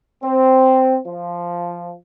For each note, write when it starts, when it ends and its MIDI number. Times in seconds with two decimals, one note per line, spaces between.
0.22 0.97 60
1.06 1.93 53